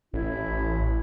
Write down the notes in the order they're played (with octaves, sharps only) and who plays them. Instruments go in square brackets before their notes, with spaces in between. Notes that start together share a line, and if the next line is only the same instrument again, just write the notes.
[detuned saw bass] A1 [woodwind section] E4